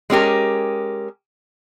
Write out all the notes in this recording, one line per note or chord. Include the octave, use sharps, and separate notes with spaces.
G#3 C#4 G4 A#4